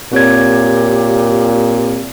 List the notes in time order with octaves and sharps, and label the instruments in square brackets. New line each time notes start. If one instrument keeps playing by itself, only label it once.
[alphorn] A#2 [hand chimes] C4 C#5 G#6 [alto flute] G4